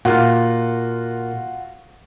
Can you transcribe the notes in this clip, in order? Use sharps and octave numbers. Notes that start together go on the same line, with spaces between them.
A#2 F4 F#4